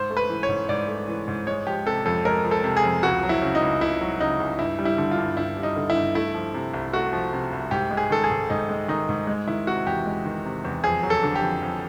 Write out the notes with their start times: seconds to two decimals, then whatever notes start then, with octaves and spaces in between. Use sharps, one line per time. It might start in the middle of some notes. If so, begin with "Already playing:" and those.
Already playing: G#2 C5
0.10 A3
0.17 B4
0.30 E3
0.43 C#5
0.49 G#2
0.69 G#2 D5
0.88 A3
1.08 E3
1.28 G#2
1.47 G#3 C#5
1.67 F3 G4
1.86 C3 A4
2.05 F2 A4
2.25 G#3 A#4
2.44 F3
2.51 A4
2.64 C3
2.77 G#4
2.84 F2
3.03 C#2 F#4
3.23 F#3
3.29 E4
3.42 C#3
3.55 D#4
3.62 C#2
3.81 C#2 E4
4.01 F#3
4.20 C#3 D#4
4.40 C#2
4.59 G2 E4
4.79 G3
4.85 E4
4.98 D3
5.11 F4
5.18 G2
5.37 G2 E4
5.57 G3
5.63 D#4
5.76 D3
5.90 E4
5.95 G2
6.15 A3 E4
6.34 F3
6.54 C3
6.74 C2
6.93 A3 F#4
7.13 F3
7.33 C3
7.53 C2
7.71 G#2 G4
7.91 G#3
7.97 G#4
8.10 D#3 A4
8.24 G#4
8.30 G#2
8.50 G#2 D#4
8.69 G#3
8.88 D#3 D#4
9.09 G#2
9.27 G#3
9.47 D#3 E4
9.67 C3 F#4
9.87 E2 G4
10.06 G#3
10.25 D#3
10.45 C3
10.65 E2
10.84 F2 G#4
11.03 F#3
11.10 A4
11.23 D3
11.36 G4
11.42 F2
11.63 F2